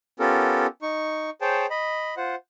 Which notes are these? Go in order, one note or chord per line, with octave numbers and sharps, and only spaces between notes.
B3 C#4 F4 G4 A4 A#4
D#4 C#6
G#4 C5 C#5 G5 A5
D#5 B5
F4 C5 F#5